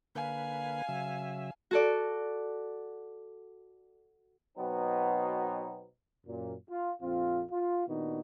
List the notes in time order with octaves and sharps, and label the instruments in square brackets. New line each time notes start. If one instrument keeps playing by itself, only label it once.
[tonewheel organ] D3 A#3 B4 [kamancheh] F5 G#5
[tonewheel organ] C#3 F#3 E5
[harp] F#4 A4 D5
[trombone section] B2 F#3 B3 C4 D#4
F#2 A#2
F4
A#1 F2 C4 F4
F4
A#2 D#3 B3 D4 D#4 F#4